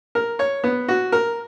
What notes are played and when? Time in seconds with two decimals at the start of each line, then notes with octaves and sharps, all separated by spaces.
0.15 A#4
0.39 C#5
0.64 B3
0.88 F#4
1.12 A#4